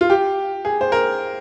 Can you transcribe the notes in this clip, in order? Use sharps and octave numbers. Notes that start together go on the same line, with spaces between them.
F4
G4
G#4
C5
A#4